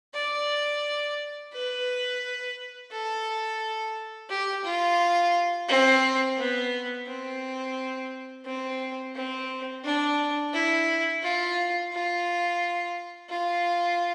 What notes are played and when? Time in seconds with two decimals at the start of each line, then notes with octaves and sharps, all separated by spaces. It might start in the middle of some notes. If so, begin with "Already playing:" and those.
0.14 D5
1.53 B4
2.91 A4
4.30 G4
4.64 F4
5.68 C4
6.38 B3
7.07 C4
8.45 C4
9.15 C4
9.84 D4
10.53 E4
11.23 F4
11.92 F4
13.30 F4